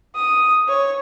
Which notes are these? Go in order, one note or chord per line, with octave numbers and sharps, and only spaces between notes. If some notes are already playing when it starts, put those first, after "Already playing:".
D#6
C#5